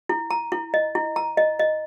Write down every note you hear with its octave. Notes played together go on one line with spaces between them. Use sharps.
E4
A#5
E4
D#5
E4
A#5
D#5
D#5